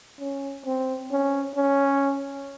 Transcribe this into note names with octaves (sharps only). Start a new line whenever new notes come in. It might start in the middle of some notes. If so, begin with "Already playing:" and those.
C#4
C4
C#4
C#4